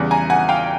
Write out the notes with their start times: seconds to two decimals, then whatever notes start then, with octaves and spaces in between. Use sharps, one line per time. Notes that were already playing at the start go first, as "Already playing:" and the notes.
Already playing: E2 C#3 E3 G3
0.11 G#5 A#5
0.30 F#5 G#5
0.49 F5 G5